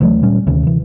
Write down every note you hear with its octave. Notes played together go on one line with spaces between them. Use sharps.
D2 E3 F#3 A3
A#2 G3 C#4
D2 C3 D#3 C#4
C3 E3